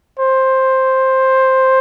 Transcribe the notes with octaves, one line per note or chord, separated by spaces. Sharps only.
C5